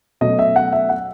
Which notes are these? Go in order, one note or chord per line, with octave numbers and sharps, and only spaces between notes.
B2 F#3 A3 C#4 D#5
E5
F#5
E5
F#5